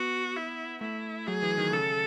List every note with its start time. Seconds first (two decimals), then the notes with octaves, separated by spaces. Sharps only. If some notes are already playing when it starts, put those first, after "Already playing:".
Already playing: B3 F#4
0.37 E4
0.81 A3 E4
1.28 F#3 G#4
1.43 E3
1.58 D#3
1.72 C#3 A4